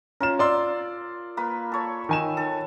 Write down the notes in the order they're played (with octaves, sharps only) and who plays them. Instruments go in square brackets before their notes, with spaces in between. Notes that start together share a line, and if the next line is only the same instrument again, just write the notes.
[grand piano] C#4 E7 [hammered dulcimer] F4 A#4
[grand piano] D5 C6 E6
[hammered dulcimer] A#3 B4
A4 C#5
[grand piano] D#3 G#5 E7
[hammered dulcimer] A4